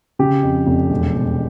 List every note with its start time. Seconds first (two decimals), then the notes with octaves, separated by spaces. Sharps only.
0.19 C#3 G4
0.43 F2
0.67 F1
0.90 E1
1.15 E1